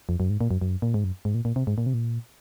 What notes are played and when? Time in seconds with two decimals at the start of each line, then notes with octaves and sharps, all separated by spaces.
0.09 F2
0.20 F#2
0.30 G#2
0.41 A#2
0.51 F#2
0.62 F#2
0.82 A#2
0.94 G#2
1.04 F#2
1.25 G#2
1.35 A#2
1.45 A#2
1.56 C3
1.67 G#2
1.78 A#2
1.86 C3
1.94 A#2